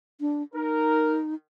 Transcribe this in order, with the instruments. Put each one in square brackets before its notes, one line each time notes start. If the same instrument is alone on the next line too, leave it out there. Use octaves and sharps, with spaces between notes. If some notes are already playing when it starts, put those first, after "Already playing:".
[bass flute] D4
[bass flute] D#4 [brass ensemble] A#4